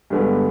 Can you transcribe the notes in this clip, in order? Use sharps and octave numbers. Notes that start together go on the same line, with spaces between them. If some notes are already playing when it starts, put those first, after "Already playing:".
G2 D3 G#3 B3